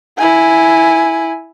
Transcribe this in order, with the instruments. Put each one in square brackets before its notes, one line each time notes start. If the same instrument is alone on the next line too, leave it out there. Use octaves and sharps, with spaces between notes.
[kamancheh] E4 G#5